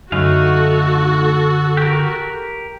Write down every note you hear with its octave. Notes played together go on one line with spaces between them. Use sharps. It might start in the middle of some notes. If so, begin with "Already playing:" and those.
F#2 D3 A3 D#4 F#4 A4 F5
G4 A#4